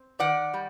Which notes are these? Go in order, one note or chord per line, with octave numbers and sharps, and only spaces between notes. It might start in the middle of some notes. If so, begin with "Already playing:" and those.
Already playing: C4
D#3 D5 F#5
G3